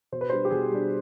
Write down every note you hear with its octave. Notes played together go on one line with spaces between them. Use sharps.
B2 C5
B4
G3 D4 C5
G4
B2 G#4
G3 D4